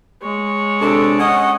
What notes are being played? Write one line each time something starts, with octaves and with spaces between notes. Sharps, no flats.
G#3 C#5
C3 D4 A4
C#4 D#5 F#5